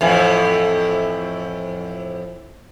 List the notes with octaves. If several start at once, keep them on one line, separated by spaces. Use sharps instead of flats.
F2 A2 E3